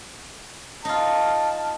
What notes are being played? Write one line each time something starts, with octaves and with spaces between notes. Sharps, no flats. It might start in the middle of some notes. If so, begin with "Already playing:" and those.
D#4 F4 A5